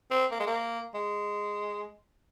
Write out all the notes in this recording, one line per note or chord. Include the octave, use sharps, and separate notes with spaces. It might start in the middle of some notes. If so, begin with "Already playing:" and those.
C4
A#3
G#3
A#3
G#3